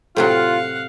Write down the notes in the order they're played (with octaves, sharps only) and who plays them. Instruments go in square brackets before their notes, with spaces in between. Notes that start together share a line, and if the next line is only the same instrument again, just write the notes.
[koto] A2 C3 F#3 [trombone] F4 [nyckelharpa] F5 F#5